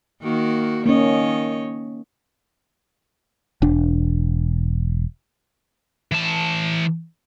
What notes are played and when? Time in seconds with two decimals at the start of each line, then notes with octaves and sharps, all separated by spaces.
0.22 D#3 A#3 F#4
0.86 D#3 A#3 C#4 C#5 D#5
3.62 E1 D4
6.12 E3 A5